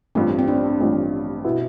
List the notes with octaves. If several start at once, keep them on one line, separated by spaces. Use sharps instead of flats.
A1 G2 F3 C4
C4
D4
A1 G2 F3
B2 B3 E4